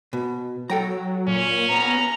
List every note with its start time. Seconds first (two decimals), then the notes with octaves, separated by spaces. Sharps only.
0.13 B2
0.70 F#3 A4 G5 A#5
1.28 A#2 C#4
1.71 B3 A#5